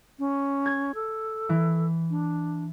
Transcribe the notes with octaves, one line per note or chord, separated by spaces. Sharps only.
C#4
G#6
A4
E3
D4